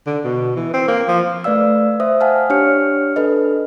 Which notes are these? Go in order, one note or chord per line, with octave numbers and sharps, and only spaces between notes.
D3
B2
E3
C4
A#3
F3
A3 B4 D5 F5 E6
C5 E5 D#6
F5 F#5 G#5 A5 F6
D4 G4 C#5 F6 C#7
D4 A4 B4 D#5